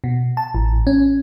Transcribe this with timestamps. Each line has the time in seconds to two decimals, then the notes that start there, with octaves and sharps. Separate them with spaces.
0.04 B2
0.37 A5
0.55 A1
0.87 C#4